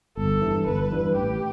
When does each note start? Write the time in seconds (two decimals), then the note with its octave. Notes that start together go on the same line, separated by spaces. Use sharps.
0.17 G1 A4
0.41 G2 E3
0.66 G1 B4
0.91 G2 E3
1.15 A1 G4